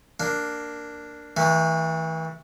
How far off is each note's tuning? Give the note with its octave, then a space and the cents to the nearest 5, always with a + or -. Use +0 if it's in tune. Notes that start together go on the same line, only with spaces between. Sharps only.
A#3 -5 D4 +0
E3 -35 A3 +20